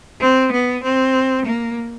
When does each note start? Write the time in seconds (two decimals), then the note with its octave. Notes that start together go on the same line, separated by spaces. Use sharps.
0.20 C4
0.52 B3
0.83 C4
1.45 A#3